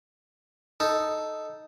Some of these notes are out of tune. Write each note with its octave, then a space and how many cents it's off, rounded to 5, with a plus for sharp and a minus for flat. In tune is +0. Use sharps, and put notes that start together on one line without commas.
D#4 +0 A4 +0